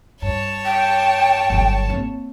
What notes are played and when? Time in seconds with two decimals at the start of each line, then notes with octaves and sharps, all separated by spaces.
0.22 G2 C#5 A5
0.65 G5
1.50 G1 F#3
1.89 A#3 C4